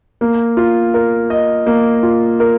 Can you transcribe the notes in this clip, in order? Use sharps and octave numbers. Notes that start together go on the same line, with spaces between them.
A#3
F4
A#4
D#5
A#3
F4
A#4